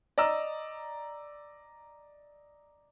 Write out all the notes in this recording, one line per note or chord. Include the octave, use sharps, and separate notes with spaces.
D5 D#5 A#5 E6